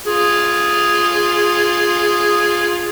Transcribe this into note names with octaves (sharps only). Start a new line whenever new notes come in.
F4 G#4